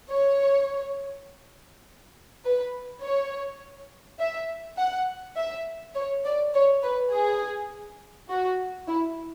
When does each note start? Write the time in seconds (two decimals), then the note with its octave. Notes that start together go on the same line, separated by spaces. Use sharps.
0.10 C#5
2.44 B4
3.02 C#5
4.19 E5
4.77 F#5
5.36 E5
5.95 C#5
6.24 D5
6.54 C#5
6.82 B4
7.11 G#4
8.29 F#4
8.87 E4